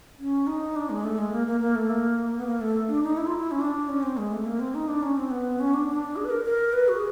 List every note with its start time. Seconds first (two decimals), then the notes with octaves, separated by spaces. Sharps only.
0.19 C#4
0.47 D#4
0.76 D4
0.90 G#3
1.04 A3
1.18 G#3
1.32 A#3
1.47 A#3
1.60 A#3
1.75 A3
1.90 A#3
2.38 B3
2.47 A#3
2.61 A3
2.88 D4
3.03 D#4
3.17 E4
3.27 F4
3.37 E4
3.51 C#4
3.60 D4
3.89 C#4
4.03 C4
4.17 G#3
4.32 A3
4.46 A#3
4.60 C4
4.75 D#4
4.88 D4
5.03 C#4
5.17 C4
5.31 B3
5.60 C#4
5.74 D4
5.89 D4
6.16 G#4
6.25 B4
6.31 A#4
6.45 A#4
6.73 B4
6.88 F#4
6.95 G#4